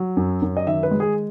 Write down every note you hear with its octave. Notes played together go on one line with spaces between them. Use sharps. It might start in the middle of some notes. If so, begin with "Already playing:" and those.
Already playing: F#3
F#2
F#2
D#5
D#3 E5
B4
G#3
G#4